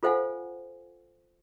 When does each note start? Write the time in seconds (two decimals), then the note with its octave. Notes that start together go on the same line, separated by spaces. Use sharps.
0.03 F4 A4 C5 F5 F#5 G#5